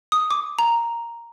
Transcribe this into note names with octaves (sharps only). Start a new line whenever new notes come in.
D#6
D6
A#5